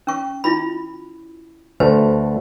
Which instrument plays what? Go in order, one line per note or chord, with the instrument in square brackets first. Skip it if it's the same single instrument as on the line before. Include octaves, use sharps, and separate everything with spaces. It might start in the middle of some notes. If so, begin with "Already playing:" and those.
[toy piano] C#4 C#6
E4 F4 B5
[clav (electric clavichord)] D2 A3 B4 [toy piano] C5